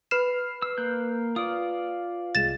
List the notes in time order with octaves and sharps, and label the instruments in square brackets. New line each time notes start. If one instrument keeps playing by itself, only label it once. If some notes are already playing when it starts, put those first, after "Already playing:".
[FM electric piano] B4 F6 C7 [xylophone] E7
[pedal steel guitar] E6
A#3 F#6 G6
[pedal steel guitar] F4 D5 [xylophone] D#6
[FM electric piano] C2 G#3 [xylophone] A6 E7